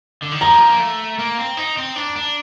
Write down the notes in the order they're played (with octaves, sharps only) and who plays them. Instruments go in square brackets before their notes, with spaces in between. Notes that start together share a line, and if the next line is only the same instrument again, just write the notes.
[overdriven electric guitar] D3
D#3
[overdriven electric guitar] F3 [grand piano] A#5
[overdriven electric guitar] A#3
A3
A#3
C4
D#4
C4
D4
D4